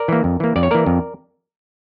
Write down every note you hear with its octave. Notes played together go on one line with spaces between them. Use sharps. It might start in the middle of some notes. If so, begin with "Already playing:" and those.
Already playing: A#4 D5
E3 A#3
F2
E3 A#3
F2 D5
C#5
E3 A#3 A#4 D5
F2